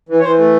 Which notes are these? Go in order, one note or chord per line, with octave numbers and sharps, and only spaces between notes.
E3
C#5
E3 C5
A3